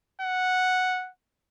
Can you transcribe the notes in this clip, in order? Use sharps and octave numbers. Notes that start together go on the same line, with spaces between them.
F#5